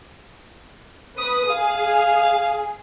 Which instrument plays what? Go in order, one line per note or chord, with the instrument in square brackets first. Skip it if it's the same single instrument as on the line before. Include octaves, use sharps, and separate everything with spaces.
[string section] B4 D#6
[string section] G#4 [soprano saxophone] F5